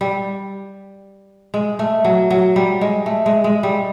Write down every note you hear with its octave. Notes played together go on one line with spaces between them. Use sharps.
G3
G#3
A3
F#3
F#3
G3
G#3
A3
G#3
G#3
G3